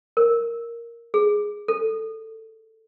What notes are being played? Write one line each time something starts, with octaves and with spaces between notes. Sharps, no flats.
A#4
G#4
A4